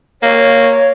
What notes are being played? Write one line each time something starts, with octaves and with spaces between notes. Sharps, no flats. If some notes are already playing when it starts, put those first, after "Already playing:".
A#3 C#5